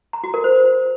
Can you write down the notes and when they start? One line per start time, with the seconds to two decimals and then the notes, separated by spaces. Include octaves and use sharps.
0.13 A#5
0.24 F#4
0.34 A#4
0.44 C5